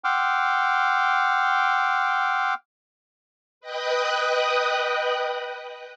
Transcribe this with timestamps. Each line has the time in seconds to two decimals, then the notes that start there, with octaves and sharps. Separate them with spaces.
0.04 F#5 G5 C6 D6 E6 F6
3.61 B4 D#5 G5 D#6 F#6